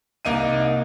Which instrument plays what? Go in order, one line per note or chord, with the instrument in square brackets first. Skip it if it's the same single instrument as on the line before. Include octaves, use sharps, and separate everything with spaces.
[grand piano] C2 A#3 D#4 D#7